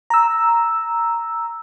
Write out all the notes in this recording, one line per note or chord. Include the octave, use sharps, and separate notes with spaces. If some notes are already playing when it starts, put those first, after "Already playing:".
A#5 E6